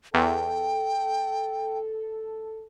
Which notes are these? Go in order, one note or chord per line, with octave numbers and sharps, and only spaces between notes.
E2 A4 G5